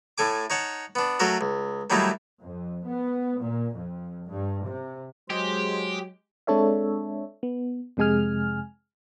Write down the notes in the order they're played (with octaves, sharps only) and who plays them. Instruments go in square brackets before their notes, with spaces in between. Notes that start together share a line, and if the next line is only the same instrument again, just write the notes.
[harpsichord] A2 A3 G#5 D6
D#4 C#5 F#5 A5
B3 D4
F#3 A3 F#4 A4 A#4
C#2
D#3 F#3 G3 A3 D#4 E4
[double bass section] F2
B3
A#2
F2
G2
C3
[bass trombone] F#3 [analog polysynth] G#3 [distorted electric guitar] G4 [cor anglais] C5
[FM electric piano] G#3 C4 D4 A4 C#5 E5
B3
F2 C3 G#3 G#4 G#5 F6